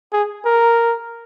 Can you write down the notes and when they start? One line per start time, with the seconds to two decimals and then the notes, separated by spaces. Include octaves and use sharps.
0.13 G#4
0.45 A#4